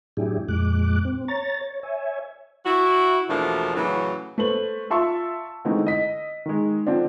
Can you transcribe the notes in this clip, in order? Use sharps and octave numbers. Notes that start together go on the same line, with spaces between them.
A2 F#3 D4 E4 G4 G#4
F2 A#2 G#3 D6 F#6
C4
C#5 A#5 A6
C#5
C#5 E5 G#5
E4 F#4
E2 B2 F3 A3 A#3 D4
A2 C#3 E3 F#3
A3 B4 C5 F#7
F4 E5 A5 C6 C#6 E6
D3 E3 G#3 A3 C4 D#4
D#5 B6
D#3 G#3
D3 F3 C4 D4